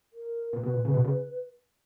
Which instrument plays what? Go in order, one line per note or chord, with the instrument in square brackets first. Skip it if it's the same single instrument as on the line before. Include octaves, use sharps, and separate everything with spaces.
[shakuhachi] A#4
[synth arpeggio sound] A#2 [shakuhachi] B4
[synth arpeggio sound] B2
A#2
C#3
B2
C#3